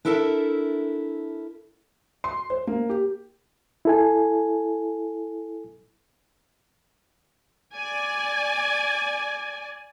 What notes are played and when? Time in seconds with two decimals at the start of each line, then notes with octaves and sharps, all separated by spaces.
0.05 D4 E4 A4 A#4 D5 E5
2.24 C6
2.50 C5
2.67 A#3
2.89 G4
3.85 E4 A4 G#5
7.75 D5 G#5